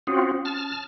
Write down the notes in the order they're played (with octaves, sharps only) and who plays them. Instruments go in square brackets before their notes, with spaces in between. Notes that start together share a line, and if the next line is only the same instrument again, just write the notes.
[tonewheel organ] C4 F4 F#4 [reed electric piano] C#4 D#6
[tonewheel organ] A5 F6